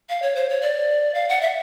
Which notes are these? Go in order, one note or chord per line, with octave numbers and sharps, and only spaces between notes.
F5
C#5
C5
C#5
D5
F5
F#5
E5